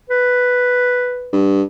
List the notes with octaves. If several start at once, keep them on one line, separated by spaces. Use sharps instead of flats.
B4
G2